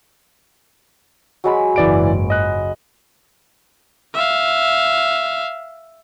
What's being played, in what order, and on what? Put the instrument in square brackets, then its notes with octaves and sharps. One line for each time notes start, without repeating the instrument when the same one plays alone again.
[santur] F#3 G#3 B5
[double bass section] F#1 C#2 G#2 [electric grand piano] E3 D5 D7
[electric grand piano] D#5 F#6
[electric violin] E5 F5